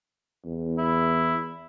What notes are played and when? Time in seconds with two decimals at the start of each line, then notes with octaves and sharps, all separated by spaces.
0.46 E2
0.78 E4